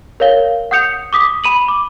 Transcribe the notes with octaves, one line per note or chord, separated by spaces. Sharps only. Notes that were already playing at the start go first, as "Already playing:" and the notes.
A#4 C#5 F5 G7
F#5 D#6 G6 C#7 F7
D6 D#6 B6
B5 D#7 F#7
D6